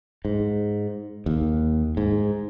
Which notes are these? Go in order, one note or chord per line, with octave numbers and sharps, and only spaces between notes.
G#2
D#2
G#2